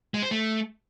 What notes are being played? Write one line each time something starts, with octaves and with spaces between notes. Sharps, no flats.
G#3
C5
A3